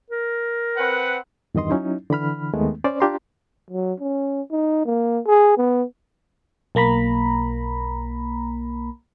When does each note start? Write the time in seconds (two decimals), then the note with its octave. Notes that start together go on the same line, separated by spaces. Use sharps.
0.11 A#4
0.77 C4 B4 F#5
1.55 E2 G2 D#3 D#5 C6
1.70 F#3 C#4 D#4 E4
2.10 D3 E3 B5 F6
2.54 D#2 D#3 G#3 A3 B3
2.84 C#4 C5 D5
3.00 D4 F4 G4 A#5 C6
3.70 F#3
4.00 C#4
4.52 D#4
4.85 A#3
5.27 G#4
5.58 B3
6.75 B1 A#3 A#5 B5